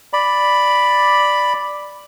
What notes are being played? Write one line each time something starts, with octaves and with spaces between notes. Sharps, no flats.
D5 B5